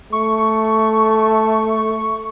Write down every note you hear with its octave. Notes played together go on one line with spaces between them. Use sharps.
A3 C#6